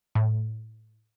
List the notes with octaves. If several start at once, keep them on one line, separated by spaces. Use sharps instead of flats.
A2